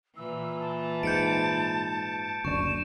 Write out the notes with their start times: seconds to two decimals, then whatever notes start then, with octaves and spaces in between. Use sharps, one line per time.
0.17 A#2 E3 E6
0.60 A5
1.03 G#2 G6 C#7 D7
2.45 F#1 D2 D4 C#6 E7